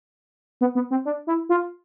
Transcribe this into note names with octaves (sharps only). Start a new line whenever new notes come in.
B3
B3
C4
D4
E4
F4